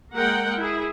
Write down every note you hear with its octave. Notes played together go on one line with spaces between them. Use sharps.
G#3 A#3 A#4 F#5 G5
E4 G#4